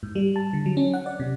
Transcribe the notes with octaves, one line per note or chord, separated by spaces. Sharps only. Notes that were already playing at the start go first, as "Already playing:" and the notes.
G#2
G3
A5
D3
F#3
C#4
F#5
D5
C3